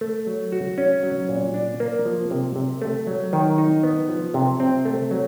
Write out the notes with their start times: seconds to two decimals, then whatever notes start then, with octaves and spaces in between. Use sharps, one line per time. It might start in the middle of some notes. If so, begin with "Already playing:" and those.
0.01 A3
0.27 F#3
0.52 F#4
0.78 C#4
1.03 F#3
1.29 A#2
1.54 D4
1.80 A#3
2.05 F3
2.31 C3
2.56 C3
2.82 A3
3.07 F#3
3.33 D#3
3.58 D#4
3.83 B3
4.09 F3
4.34 C3
4.60 C4
4.85 A3
5.11 F#3